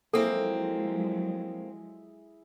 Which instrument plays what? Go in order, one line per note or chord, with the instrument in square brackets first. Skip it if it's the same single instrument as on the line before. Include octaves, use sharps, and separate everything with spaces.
[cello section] F3 F#3 G#3 [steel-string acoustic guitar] A#3 C4 [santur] E4 G#4 [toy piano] A4